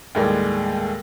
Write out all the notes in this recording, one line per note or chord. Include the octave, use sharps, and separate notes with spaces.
D#2 A2 G3 G#3